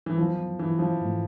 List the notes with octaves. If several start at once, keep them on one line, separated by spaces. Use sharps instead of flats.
E3
D#2 D#3 F3 F#3 B3
E3
F3
G#2 E3 A3